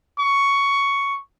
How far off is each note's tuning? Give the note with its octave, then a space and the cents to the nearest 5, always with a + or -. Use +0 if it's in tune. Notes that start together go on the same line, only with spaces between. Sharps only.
C#6 +10